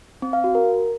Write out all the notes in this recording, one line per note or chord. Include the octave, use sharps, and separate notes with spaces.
C4
F5
F#4
A#4